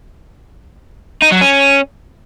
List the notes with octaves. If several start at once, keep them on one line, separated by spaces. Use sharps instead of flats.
D#4
F#3
C#4